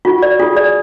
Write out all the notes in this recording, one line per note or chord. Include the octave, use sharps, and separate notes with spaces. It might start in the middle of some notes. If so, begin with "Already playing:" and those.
F4 F#4
D5
F4 G#4
D5